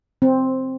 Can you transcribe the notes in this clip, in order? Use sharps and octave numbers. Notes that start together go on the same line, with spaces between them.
C4